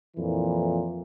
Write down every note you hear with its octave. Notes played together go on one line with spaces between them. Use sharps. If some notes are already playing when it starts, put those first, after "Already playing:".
F2 A#2 E3